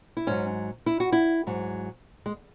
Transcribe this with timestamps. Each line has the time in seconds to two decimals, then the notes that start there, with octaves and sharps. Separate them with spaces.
0.17 E4
0.27 G#2 F#3 C#4
0.86 E4
1.00 F#4
1.12 E4
1.47 G#2 F#3
2.26 G#3